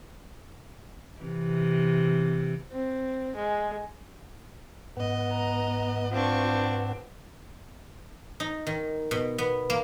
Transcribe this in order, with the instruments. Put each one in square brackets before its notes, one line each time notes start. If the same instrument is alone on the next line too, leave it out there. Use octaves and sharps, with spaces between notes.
[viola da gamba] C3 E3
[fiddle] C4
G#3
[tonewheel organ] G#2 B4 F#5 [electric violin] B3 D#5
[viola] A#5
[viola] C4 D4 [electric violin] F4 C#6
[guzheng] D#4
D#3
B2
B3
A#3